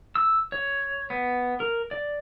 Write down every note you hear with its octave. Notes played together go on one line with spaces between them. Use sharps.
E6
C#5
B3
A#4
D5